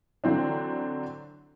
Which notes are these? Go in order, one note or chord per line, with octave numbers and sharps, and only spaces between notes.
D3 E3 F#3 C4 D4